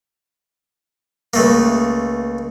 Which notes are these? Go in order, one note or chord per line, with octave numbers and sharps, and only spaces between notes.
C#2 A3 A#3